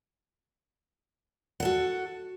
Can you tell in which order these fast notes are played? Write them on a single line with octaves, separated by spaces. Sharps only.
F#5 A4 F#4